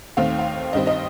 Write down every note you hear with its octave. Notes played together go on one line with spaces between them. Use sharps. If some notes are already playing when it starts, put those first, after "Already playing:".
D#2 D#3 A3 C4 F5
F5
G2 D#3 G3 C4 D#5
D#5